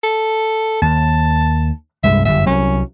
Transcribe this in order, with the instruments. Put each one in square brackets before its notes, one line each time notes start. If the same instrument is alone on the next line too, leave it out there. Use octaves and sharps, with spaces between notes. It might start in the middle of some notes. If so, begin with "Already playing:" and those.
[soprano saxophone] A4
[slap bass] D#2 [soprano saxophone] A5
[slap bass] C2 G2 G#3 [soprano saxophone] E5
[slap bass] G1 F#2 [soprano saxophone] E5
[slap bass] C2 F#3 [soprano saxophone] C#4